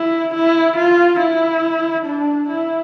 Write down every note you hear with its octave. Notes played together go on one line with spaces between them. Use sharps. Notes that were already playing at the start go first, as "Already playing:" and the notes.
Already playing: E4
E4
F4
E4
D4
E4